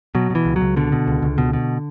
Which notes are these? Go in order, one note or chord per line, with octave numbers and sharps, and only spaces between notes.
B2 F#3
B2 E3
C#2
C#2 F#3
B2 D3
B2
C#2
C#2
B2
B2